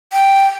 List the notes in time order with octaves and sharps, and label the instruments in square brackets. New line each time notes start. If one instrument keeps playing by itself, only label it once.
[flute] G5